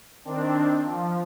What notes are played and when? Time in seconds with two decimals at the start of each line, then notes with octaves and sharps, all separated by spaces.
0.25 D#3 C4 D4
0.85 F3